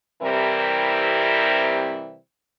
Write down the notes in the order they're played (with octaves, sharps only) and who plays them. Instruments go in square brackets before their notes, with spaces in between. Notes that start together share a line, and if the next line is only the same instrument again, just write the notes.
[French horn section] C3 E3 G3 C4 E4 A#4